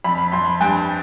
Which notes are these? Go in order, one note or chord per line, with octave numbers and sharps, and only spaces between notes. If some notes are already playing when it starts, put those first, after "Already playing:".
F2 B5
B5
F2 C6
B5
G2 G5